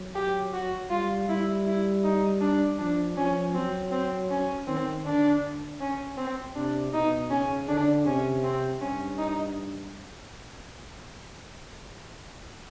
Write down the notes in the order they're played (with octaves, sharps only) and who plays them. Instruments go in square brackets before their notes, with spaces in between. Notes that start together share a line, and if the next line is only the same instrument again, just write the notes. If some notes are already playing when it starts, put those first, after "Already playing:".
Already playing: [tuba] F#3
[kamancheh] G4
F#4
[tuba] G3 [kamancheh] F4
[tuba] G3 [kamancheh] E4
[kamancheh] E4
D#4
D4
[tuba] F3 [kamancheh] D4
[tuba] F3 [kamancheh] C#4
[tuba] F#3 [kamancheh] C4
[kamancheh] C4
C#4
[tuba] D#3 [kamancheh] C4
[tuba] D3 [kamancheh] D4
[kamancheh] C#4
C4
[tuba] C3 [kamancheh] D4
[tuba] B2 [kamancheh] D#4
[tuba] C#3 [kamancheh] C#4
[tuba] D3 [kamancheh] D4
[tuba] C3 [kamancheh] C#4
[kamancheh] C4
[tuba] G2 [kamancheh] C#4
[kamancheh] D#4